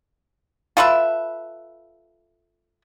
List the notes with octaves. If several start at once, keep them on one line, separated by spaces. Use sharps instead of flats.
F4 A4 B4 E5